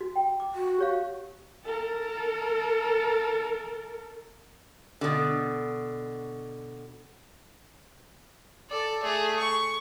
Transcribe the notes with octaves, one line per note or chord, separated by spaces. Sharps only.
F#4
G5
D6
F#4
G4 C#5 F5
A4 A#4
B2 D3
A4 D5
A3 G#4
C#6